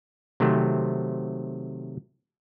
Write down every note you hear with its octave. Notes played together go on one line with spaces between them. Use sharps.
C3 D#3 F#3 A3 C4